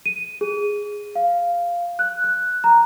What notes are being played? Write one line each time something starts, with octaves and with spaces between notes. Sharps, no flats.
D#7
G#4
F5
F#6
F#6
A#5